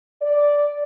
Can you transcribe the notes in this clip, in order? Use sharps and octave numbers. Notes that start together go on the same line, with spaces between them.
D5